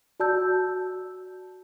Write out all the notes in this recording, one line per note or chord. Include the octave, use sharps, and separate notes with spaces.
F#4 D5 A5 E6 G6